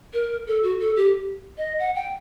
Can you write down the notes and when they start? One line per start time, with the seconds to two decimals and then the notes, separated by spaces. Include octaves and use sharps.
0.13 A#4
0.47 A4
0.63 F#4
0.80 A4
0.96 G4
1.58 D#5
1.79 F#5
1.95 G5